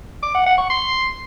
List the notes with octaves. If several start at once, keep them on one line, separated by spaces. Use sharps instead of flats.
D6
F#5
F#5
C#6
C6